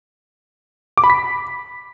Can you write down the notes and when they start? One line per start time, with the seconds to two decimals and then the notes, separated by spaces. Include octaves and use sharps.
0.97 D6
1.04 B5
1.10 B6